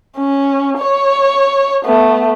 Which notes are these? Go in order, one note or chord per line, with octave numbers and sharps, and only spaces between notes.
C#4
C#5
A3 B3